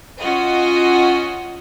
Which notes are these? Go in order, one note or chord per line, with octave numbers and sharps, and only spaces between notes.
C#4 F4 F#4 D#5